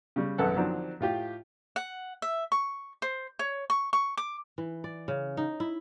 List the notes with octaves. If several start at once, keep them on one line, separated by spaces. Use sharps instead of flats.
C#3 G3
G#1 F#2 B3 A4 F#5
D3 D#3 F3 F#3 C4 D4
A2 F4 G4
F#5
E5
C#6
C5
C#5
C#6
C#6
D6
E3
D5
C#3
D#4
E4